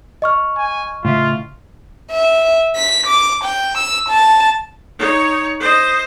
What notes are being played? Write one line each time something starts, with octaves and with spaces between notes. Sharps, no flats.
D#5 C#6 F6
G#5
A2 C#3 F4 E5
E5
B6
D6
G5
E6
A5
D#4 C#5
C5 D#5